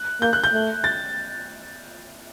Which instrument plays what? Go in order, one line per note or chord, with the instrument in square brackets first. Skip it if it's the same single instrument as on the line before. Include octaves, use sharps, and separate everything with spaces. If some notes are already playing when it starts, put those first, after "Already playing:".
Already playing: [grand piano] F#6
[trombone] A#3 [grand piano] G6
[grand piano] F#6
G6
[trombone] A3
[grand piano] A6